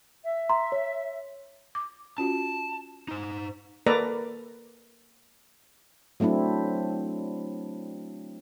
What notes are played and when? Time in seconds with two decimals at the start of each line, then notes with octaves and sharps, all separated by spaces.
0.23 E5
0.49 A#5 C6
0.72 C#5
1.75 D6
2.18 C#4 F4 F#4 A5
3.08 D#4 C5
3.87 A#3 A4 B4 D5 A#5
6.20 F#3 A3 C4 D4 E4